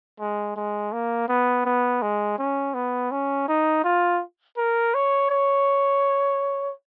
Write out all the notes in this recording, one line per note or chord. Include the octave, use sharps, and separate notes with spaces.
G#3
G#3
A#3
B3
B3
G#3
C#4
B3
C#4
D#4
F4
A#4
C#5
C#5